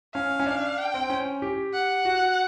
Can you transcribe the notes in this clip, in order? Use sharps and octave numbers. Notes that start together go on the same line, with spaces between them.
C#4 F5
C#4
D4
G5
C4
C#4
G4
F#5
F#4